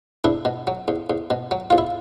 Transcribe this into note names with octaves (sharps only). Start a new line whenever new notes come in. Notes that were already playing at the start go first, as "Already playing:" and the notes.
E2 D4 E4
B2
F#3
E2
E2
B2
F#3
E2 F4
E4